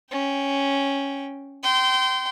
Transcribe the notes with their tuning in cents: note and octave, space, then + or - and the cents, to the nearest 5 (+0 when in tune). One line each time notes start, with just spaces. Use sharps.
C#4 +0 G5 +0
G5 -25 C6 -20